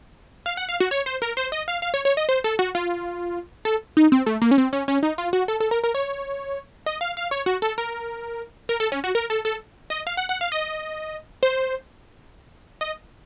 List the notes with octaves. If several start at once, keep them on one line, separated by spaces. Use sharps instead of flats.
F5
F#5
F5
F#4
C#5
C5
A#4
C5
D#5
F5
F5
C#5
C#5
D#5
C5
A4
F#4
F4
A4
D#4
C4
A3
A#3
C#4
C4
C#4
C#4
D#4
F4
F#4
A4
A4
A#4
A#4
C#5
D#5
F5
F5
C#5
F#4
A4
A#4
A#4
A4
C#4
F#4
A#4
A4
A4
D#5
F5
F#5
F#5
F5
D#5
C5
D#5